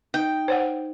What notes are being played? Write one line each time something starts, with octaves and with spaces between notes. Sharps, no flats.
D#4 G5
C5 C#5 F#5